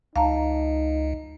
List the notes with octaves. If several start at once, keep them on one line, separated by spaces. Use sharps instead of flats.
C#2 D#4 F5 A5 A#5